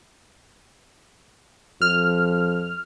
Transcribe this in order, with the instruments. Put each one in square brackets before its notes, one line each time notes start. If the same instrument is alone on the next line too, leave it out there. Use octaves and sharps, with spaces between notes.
[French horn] F2 [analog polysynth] F6